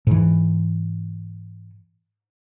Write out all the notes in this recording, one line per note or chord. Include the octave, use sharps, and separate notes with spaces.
G#2 E3